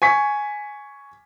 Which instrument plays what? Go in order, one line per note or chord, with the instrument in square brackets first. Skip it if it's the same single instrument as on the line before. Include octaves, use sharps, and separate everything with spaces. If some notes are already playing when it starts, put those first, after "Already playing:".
[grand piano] G#5 C#6 B6